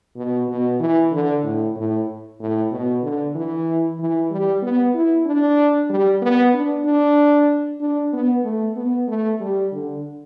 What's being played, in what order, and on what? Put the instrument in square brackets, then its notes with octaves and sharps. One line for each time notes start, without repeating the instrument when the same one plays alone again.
[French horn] B2
B2
E3
D3
A2
A2
A2
B2
D3
E3
E3
G3
B3
E4
D4
G3
B3
D4
D4
D4
B3
A3
B3
A3
G3
D3